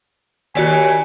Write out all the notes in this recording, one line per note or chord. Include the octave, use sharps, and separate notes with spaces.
D#2 F#4 D5 G#5 B6